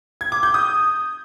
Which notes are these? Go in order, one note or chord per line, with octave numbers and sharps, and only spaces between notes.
G#6
D6
G6
D#6